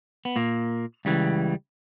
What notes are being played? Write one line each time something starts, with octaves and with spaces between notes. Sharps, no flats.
B3
A#2 A#3
C#2 C#3 E3 G3